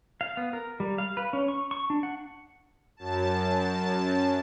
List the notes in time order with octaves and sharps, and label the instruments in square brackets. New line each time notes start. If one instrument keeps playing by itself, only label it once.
[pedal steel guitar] F5
B3
A#4
G3
F5
B4
C#4
C#6
C#6
D4
F#5
[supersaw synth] F#2 A5